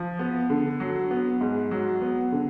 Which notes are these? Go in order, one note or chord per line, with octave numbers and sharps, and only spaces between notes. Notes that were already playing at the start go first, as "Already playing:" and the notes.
Already playing: F3
B3
D3
F#3
B3
G#2
F#3
B3
D3